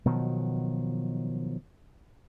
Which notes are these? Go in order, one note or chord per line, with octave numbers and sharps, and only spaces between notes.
B2 D#3 F3 F#3